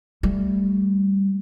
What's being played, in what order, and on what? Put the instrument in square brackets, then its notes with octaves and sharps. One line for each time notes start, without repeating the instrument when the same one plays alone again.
[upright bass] G3 A3